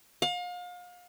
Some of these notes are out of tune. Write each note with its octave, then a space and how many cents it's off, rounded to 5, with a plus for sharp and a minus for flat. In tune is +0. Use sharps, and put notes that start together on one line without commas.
F5 +35